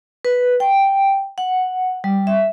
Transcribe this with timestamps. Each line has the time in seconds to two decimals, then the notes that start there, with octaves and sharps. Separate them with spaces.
0.25 B4
0.60 G5
1.38 F#5
2.04 G3
2.27 E5